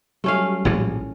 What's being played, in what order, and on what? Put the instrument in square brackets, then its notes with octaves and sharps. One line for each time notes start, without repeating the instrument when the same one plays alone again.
[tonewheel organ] F#3 G3 [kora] A3 C#4 F5
[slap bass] A#1 A2 E3